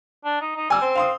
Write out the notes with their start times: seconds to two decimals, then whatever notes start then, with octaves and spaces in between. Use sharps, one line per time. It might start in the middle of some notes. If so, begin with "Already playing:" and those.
0.25 D4
0.41 D#4
0.56 D#4
0.70 G3 G#5 E6
0.82 C4
0.95 F5 C6 D#6